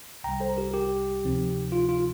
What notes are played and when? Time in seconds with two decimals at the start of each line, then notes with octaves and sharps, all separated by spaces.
0.24 C2 C3 G3 G5 A#5
0.40 A4 C5
0.57 G4 A#4
0.74 G4
1.23 D2 C3 F3 C4 D#4
1.72 F4
1.89 F4